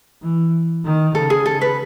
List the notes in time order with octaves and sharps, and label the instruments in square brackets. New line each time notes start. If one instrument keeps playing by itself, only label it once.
[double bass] E3
D#3
[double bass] C#3 [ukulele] A4
[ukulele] G#4
A4
B4